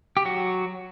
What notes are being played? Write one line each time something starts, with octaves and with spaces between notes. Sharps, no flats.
G4
F#3 F#4